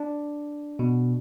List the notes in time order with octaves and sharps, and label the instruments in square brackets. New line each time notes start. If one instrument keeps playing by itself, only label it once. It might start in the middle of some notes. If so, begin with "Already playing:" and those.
Already playing: [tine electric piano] D4
B2